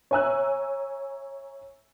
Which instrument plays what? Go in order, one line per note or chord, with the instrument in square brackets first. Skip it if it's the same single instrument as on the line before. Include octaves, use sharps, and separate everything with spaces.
[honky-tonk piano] C#5 E5 G#5 A#5 E6 F#6